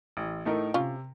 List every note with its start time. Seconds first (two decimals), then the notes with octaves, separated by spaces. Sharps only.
0.17 A1
0.45 A2 A3 D#4 A#4
0.74 C3 C#4 F4